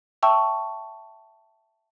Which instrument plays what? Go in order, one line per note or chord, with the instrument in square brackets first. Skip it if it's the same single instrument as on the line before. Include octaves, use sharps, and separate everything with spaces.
[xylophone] E5 G5 A5 C#6 E6